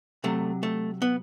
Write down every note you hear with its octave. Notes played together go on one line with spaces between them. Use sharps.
C3 F#3 A3
A3
B3